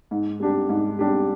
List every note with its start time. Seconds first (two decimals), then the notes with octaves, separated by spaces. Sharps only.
0.11 G#2
0.40 G3 D4 G4
0.69 G#2
0.99 G3 D4 G4